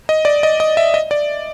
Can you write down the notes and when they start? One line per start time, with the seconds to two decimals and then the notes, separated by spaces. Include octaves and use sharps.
0.09 D#5
0.25 D5
0.43 D#5
0.60 D#5
0.77 E5
0.94 D#5
1.11 D5